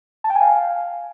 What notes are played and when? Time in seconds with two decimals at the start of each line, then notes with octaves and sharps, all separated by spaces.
0.24 A5
0.30 G5
0.36 G#5
0.41 F5